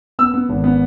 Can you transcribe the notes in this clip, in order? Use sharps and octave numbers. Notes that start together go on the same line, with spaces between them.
B3 E6
B3
G#1
B3